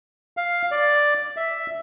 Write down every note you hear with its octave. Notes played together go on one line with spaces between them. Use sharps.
F5
D5
E5